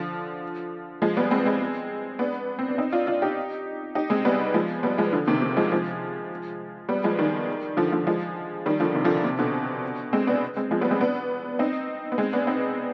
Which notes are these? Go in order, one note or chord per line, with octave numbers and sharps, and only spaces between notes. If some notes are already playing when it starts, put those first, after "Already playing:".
Already playing: D3 F3
F3 G#3
G3 B3
G#3 C4
G#3 C4
B3 D4
C4
D4
C4 D#4
D4 F4
D4 F4
D#4 G4
D#4 G4
G#3 C4
G3 B3
F3 G#3
G3 B3
F3 G#3
D3 F3
C3 D#3
C3
F3 G#3
F3 G#3
G3 B3
F3 G#3
D#3 G3
D3 F3
D3 F3
F3 G#3
D#3 G3
D3 F3
C3 D#3
D3 F3
C3
B2 D3
G#3 C4
B3 D4
G#3 C4
F3 G#3
G3 B3
G#3 C4
B3 D4
C4 D#4
B3
G#3 C4
B3 D4
C4 D#4